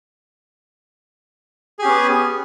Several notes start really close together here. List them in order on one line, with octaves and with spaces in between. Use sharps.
G#4 G4 C#4 B3